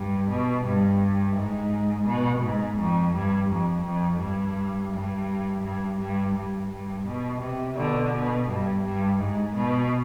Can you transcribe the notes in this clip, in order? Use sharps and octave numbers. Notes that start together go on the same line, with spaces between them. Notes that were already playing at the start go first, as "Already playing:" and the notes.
Already playing: G2
B2
G2
G#2
B2
G#2
F2
G2
F2
F2
G2
G2
G2
G2
G2
G2
B2
C3
B2 D3
B2
G2
G2
G#2
B2